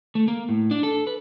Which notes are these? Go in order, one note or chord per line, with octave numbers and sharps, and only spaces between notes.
A3
A#3
A2
D4
A4
B4